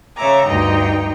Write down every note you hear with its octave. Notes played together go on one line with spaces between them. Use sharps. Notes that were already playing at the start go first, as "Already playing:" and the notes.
C#3 C#5 E5 A#5 D6
D2 G2 D#4 D#5 G5 A#5